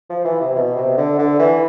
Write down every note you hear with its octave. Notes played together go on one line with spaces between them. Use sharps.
F3
E3
C3
B2
C3
D3
D3
E3